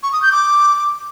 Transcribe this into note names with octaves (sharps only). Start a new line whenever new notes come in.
C#6
D#6
G6
D6